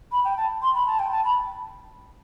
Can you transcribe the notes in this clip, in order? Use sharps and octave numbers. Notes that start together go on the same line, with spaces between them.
B5
G5
A5
C6
B5
A5
G5
A5
B5